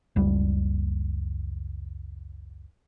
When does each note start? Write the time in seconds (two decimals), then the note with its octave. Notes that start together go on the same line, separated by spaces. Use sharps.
0.16 F#1 C#2 G3